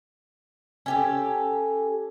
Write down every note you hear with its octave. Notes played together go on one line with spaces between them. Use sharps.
C#4 G4 A4